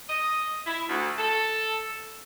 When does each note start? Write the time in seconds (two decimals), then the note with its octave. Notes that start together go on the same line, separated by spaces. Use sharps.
0.08 D#5
0.65 E4
0.88 D2
1.18 A4